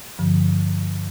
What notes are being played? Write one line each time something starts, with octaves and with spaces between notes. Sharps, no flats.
G2 D3 F3